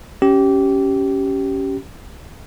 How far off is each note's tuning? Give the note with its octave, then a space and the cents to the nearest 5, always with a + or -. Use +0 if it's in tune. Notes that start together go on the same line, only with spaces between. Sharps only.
C#4 +0 G4 -20